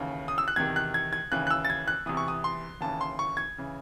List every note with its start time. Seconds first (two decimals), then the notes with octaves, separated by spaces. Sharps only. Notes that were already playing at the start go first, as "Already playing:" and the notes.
Already playing: D#2 C#3 E3
0.28 D#6
0.38 E6
0.48 F#6
0.56 E2 C3 D#3 G#6
0.76 F#6
0.94 G#6
1.13 G#6
1.32 D#2 C#3 E3 F#6
1.47 F#6
1.51 E6
1.65 A6
1.70 G#6
1.88 F#6
2.06 E2 C3 E3 D#6
2.17 C#6
2.28 D#6
2.44 C6
2.81 D#2 C#3 E3 A5
3.01 C6
3.19 C#6
3.37 G#6
3.58 C#3 E3